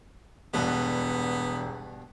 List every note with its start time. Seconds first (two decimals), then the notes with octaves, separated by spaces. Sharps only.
0.54 E1 G2 B2 B3